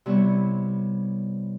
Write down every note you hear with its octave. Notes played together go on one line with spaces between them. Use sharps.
C3 G3 B3 E4 C#5